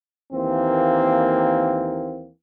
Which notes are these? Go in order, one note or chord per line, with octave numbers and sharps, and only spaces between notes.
D#2 E3 A#3 C4